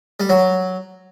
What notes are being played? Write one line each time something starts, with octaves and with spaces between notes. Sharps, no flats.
G3
F#3